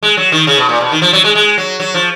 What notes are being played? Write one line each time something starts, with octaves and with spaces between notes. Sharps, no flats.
G#3
F#3
D#3
C#3
B2
A#2
B2
D#3
F3
F#3
G#3
G#3
F#3
F#3
F3